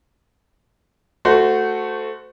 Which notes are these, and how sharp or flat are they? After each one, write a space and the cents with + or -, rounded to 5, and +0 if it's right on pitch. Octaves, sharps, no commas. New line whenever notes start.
A3 +0 F#4 +0 C5 -20